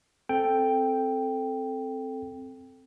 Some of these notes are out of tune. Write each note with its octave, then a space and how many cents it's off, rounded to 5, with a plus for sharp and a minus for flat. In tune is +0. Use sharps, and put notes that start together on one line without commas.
C4 +0 A4 +0 G5 +0